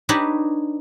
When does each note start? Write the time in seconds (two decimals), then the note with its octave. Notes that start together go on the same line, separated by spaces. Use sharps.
0.09 D4 D#4 G4 B4 C#5